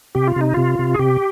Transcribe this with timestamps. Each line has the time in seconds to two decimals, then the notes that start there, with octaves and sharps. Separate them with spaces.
0.15 C3 G4
0.28 F4
0.36 C3 D#4
0.54 C3 F4
0.79 C3
0.94 G#4
0.99 C3 G4